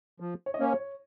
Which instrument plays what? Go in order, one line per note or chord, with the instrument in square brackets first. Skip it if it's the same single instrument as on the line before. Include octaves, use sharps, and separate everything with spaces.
[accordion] F3
[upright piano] C#5
D#5
[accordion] A#3 C#4 [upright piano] C#5
[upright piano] C#5